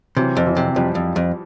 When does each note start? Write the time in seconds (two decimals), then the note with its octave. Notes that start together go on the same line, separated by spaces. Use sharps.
0.16 C3 E3 F#3
0.37 F2
0.46 E3 F#3
0.57 C3
0.76 F2 F3 G3
0.95 F2
1.16 F2